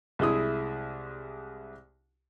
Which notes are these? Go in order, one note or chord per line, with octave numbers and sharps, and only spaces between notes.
C2 G#3 E4 D#6